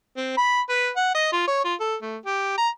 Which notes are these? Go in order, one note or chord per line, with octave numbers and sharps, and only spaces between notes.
C4
B5
B4
F#5
D#5
F4
C#5
F4
A4
A3
G4
A#5